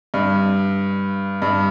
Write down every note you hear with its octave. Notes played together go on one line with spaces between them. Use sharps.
G2
G2